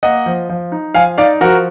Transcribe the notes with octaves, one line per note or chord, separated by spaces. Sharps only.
A#3 D#5 F#5
F3
F3
D#4
F3 F5 G#5
D#4 D5 F5
F3 F#4 A#4